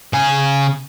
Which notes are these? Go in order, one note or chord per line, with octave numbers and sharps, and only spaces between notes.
C#3 G#5